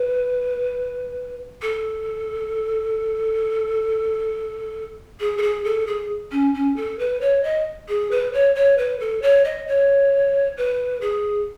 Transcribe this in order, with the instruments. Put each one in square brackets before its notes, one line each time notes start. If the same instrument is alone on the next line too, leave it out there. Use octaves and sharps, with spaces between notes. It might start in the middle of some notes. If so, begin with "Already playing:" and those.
Already playing: [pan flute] B4
A4
G#4
A4
G#4
A4
G#4
C#4
C#4
A4
B4
C#5
D#5
G#4
B4
C#5
C#5
B4
A4
C#5
D#5
C#5
B4
G#4